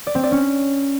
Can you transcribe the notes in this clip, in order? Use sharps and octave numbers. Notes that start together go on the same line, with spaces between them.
D5
C4
D5
C#4